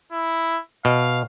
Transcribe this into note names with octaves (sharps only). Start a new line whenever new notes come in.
E4
B2 F5